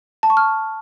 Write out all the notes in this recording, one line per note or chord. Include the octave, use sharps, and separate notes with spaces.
A5
C#6
F6